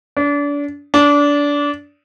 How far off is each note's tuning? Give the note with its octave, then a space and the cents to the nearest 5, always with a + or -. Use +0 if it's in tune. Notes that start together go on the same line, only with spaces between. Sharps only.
D4 -35
D4 -25